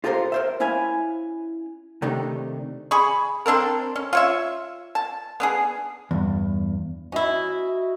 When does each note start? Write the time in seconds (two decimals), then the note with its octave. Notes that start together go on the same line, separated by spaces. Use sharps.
0.04 F4 G4 A4 A#4 C5 F5
0.32 A#4 C5 E5
0.60 C#4 E4 E5 F5 G#5
2.02 C3 D#3 A3 D4 D#4 G4
2.91 G#4 B5 C#6
3.46 C4 D4 A4 A#4
3.96 C#4
4.13 F4 C#5 E5
4.95 A5
5.40 B3 D4 G#4
6.11 E2 G2
7.12 C#4 E4 F#4 D#5 E5